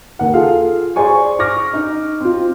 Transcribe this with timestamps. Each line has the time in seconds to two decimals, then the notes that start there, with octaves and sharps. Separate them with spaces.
0.19 D#2 F#5
0.34 F4 G#4 A4 F5
0.96 G#4 C5 D5 G#5 C#6
1.39 C#6 D6 F6 A#6
1.73 D#4
2.21 C4 F4